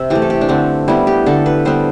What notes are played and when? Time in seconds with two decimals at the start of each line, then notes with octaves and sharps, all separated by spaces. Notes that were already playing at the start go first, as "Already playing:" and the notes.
Already playing: C3 E5
0.10 E3 A3 G4
0.22 A4
0.30 G4
0.41 D4
0.49 D3 C4
0.88 G3 B3 E4
1.07 G4
1.26 D3 A4
1.46 B4
1.65 G3 B3 C5